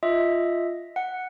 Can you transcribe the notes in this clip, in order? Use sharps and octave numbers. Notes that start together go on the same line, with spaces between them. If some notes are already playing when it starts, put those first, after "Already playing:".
F4 D#5 E5
F#5